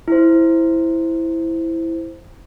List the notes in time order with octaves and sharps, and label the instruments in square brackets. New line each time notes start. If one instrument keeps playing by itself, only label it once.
[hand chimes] E4 C5